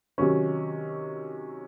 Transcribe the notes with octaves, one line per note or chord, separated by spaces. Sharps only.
C3 D#3 F#3 C#4